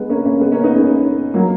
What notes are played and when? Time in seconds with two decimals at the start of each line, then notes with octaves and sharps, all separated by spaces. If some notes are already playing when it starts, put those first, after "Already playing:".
Already playing: G#3 B3
0.09 A#3 C#4
0.25 A#3 C#4
0.41 G#3 B3
0.52 A#3 C#4
0.64 B3 D#4
0.76 A#3 C#4
1.34 F#3 A#3